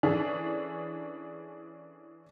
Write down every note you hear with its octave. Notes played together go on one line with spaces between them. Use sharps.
E3 C#4 D4 G#4 A4